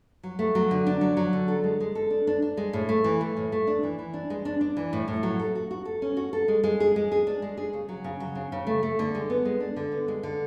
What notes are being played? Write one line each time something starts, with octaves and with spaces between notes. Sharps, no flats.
F#3
A3
F#3
D3
D4
F#3
F#3
D3
A4
G#3
G#3
A4
D4
D4
D4
G#3
A2
A3
E3
A3
A2
A3
D4
E3
E3
D4
G#3
D4
D4
E3
A2
A2
F#3
A4
F#4
F#4
A4
C#4
F#4
A4
G#3
G#3
G#4
G#3
G#4
D4
G#3
G#4
C#3
F#3
C#3
F#3
C#3
C#3
A3
A3
D3
G#3
B3
G#3
D4
D3
B3
G#3
D3